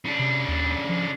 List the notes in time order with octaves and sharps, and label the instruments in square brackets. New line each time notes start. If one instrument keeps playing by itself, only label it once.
[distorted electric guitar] C#3 D4
[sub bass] C3
D#2
F3